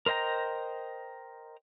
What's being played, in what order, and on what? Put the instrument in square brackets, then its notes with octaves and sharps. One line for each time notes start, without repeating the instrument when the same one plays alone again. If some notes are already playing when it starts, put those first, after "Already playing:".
[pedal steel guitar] A#4 C5 D#5 G5 A#5